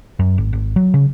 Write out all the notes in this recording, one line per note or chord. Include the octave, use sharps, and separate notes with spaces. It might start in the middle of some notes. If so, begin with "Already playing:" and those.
F#2
G#1
G#1
F#3
C#3